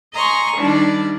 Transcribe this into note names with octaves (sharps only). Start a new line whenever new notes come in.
D#5 G#5 A#5 C6 C#6
D#3 G3 D4 E4